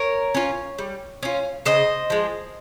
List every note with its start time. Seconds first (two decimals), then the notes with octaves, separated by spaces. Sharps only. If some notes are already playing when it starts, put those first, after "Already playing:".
Already playing: A#4 C#5
0.35 C#4 F4
0.78 G3
1.23 C#4 F4
1.65 C#3 C5 D#5
2.10 F3 G#3